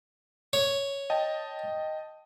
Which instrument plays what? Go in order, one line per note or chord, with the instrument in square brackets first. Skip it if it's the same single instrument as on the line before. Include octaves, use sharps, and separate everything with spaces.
[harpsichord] C#5
[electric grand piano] D#5 G5 A5